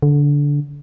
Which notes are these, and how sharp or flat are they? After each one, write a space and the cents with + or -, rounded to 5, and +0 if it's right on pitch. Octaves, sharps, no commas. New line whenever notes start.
D3 -20